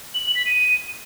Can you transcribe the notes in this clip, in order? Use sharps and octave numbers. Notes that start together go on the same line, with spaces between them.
F#7
F#7
B6
D#7